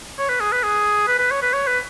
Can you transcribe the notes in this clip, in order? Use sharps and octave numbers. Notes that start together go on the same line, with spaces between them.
C#5
B4
G#4
B4
G#4
B4
B4
C#5
B4
C#5
B4